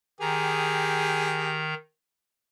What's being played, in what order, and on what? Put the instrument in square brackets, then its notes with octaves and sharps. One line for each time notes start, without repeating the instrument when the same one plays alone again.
[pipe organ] D#3 A#5 [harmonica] G4 G#4